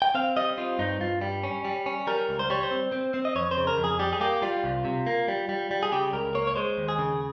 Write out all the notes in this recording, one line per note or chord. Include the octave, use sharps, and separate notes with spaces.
G5
C4 F5
G3 D#5
C4 F4
G2 D#4
G2 F4
G3
C#4
G3
C#4
G3 A#4
C#2
C5
G3 C#5
C5
C4
C4
C4
D#5
F2 C#5
C5
C#3
A#4
F2
G#4
G3 G4
G#4
A#3 G4
G3 F4
C2
C3
A#3
G3
G3
G3
G#4
C#3 G4
C#2 A#4
A#3 C#5
C#5
G#3 C5
D#2
G#4
C#3